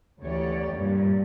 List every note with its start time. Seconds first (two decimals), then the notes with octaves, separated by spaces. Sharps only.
0.21 D2 E3 C#4 G4 C#5 D5
0.73 G2 A#2